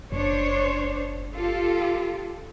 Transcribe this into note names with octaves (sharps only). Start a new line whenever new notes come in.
F#1 D4 C5 C#5
F4 G4 A4